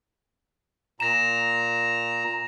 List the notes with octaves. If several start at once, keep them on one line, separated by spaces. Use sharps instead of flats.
A#2 A#5 A#6 E7